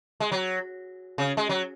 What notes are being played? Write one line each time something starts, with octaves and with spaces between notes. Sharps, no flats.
G#3
F#3
C#3
G#3
F#3